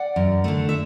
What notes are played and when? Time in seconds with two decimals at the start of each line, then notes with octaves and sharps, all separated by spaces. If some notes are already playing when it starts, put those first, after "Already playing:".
Already playing: D5 F#5
0.16 F#2
0.44 D3 A3
0.69 E5